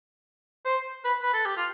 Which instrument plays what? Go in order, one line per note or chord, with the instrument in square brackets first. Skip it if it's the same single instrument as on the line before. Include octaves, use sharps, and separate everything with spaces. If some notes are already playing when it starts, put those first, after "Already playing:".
[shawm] C5
B4
B4
A4
G4
F4